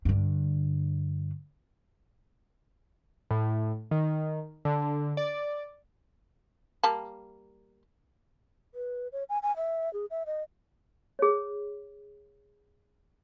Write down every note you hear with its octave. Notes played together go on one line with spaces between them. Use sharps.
G2 D3
A2
D#3
D3
D5
G3 A#3 A5
B4
C#5
G#5
G#5
E5
G#4
E5
D#5
G#4 C#5